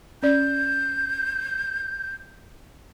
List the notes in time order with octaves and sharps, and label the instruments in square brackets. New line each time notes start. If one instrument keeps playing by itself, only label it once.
[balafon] C#4 D5 [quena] G6